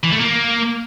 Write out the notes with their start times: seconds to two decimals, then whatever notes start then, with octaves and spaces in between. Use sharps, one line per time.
0.03 E3
0.12 A3
0.20 A#3